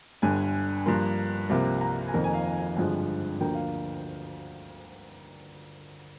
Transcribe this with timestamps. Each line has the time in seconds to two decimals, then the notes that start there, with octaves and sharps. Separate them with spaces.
0.22 G1 G2 D3 G#5
0.86 G2 F3 A#3 C6
1.50 C2 C3 F3 A#3
1.81 A#5
2.07 G#5
2.14 F1 F2 D#3 A#3 A#5
2.24 G#5
2.34 F5
2.77 G#1 G2 D3 F3 G#3
3.40 D2 D3 F3 A#3 G5
3.54 F5